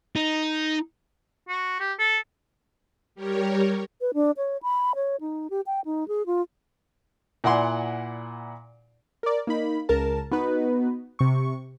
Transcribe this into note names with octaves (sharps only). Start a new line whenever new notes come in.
D#4
F#4
G4
A4
G3 G4 A#4 C#5
B4
D4
C#5
B5
C#5
D#4
G4
G5
D#4
G#4
F4
A#2 E4 D5 F#5 G#5 C6
A#4 D5
A#3 D#4 B5
C#2 A#4 A5
B3 D#4 F#4 B4
C3 C#6